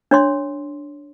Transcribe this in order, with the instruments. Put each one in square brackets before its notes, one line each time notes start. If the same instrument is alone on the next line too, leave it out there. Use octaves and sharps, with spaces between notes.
[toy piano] D4 C#5 C6